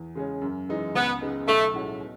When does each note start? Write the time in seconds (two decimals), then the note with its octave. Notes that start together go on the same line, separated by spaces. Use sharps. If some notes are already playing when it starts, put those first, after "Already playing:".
Already playing: E2
0.15 C#3 G#3 C#4
0.41 F#2
0.69 E3 G#3 D#4
0.95 C#2 B3
1.21 C#3 G#3 B3 D#4
1.47 B1 A3
1.74 A2 G#3 C#4 F#4
2.00 B2